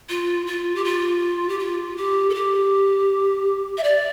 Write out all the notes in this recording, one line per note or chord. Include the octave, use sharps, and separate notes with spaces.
F4
F4
G4
F4
G4
F4
G4
A4
G4
E5
D5